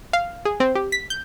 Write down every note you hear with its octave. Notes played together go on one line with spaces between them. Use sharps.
F5
G#4
C4
G4
B6
G6